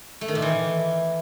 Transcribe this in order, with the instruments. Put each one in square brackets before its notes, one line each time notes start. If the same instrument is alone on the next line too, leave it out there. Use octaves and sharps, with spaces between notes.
[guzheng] A3
D#3
A#2
E3